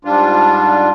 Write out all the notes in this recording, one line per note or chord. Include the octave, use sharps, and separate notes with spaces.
G#2 G3 D4 F4